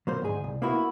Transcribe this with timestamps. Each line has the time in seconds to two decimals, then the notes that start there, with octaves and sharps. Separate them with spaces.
0.07 F#3 A#3 C5
0.22 D2 G#2 G#4
0.44 C2
0.62 A#3 B3 E4 F#4